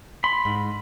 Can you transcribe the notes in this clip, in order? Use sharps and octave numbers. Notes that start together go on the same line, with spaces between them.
B5 C6
G#2